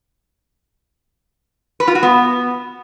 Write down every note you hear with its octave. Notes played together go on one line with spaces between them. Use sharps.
B4
F4
F#4
B3